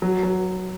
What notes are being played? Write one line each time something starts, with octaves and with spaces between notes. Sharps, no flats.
F#3
F#3